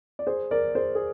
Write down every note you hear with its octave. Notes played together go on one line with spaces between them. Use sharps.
D5
G#4 C5
A#4 D5
G#4 C5
G#4